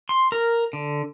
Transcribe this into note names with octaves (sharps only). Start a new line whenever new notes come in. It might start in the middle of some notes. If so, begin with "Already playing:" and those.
C6
A#4
D3